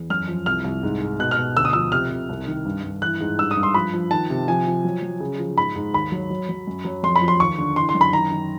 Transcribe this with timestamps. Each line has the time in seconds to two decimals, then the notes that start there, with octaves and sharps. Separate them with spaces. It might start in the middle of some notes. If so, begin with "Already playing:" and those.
Already playing: E2
0.10 F#2 F6
0.28 F3
0.46 C2 F6
0.64 C2
0.83 G#2
1.01 G#2
1.19 B2 F#6
1.31 F6
1.37 B2
1.56 D2 E6
1.65 D#6
1.73 F3 E6
1.92 C3 F6
2.10 C3
2.29 C2
2.47 D#3
2.65 G2
2.84 G2
3.02 E3 F#6
3.20 G#2
3.38 G2 E6
3.51 D#6
3.57 G2
3.63 C6
3.74 F3 B5
3.93 F3
4.11 D#3 A5
4.30 C3
4.48 F3 G#5
4.67 F3
4.85 F#3
5.02 F#3
5.20 C#3
5.39 F3
5.58 G#2 B5
5.76 G#2
5.93 D#2 B5
6.12 F#3
6.30 F#3
6.49 F#3
6.67 F#2
6.85 F#3
7.03 F2 C6
7.16 B5
7.21 F3
7.28 C6
7.40 D#2 C#6
7.58 D3
7.76 E3 C6
7.89 C6
7.95 F#2
8.01 B5
8.12 D#3 A#5
8.32 D#3